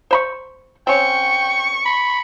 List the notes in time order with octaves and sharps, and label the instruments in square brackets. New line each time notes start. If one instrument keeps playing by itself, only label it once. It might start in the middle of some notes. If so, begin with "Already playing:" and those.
[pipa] C5 B5 C#6
[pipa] C4 C#4 [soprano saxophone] G5 [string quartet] C#6
[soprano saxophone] B5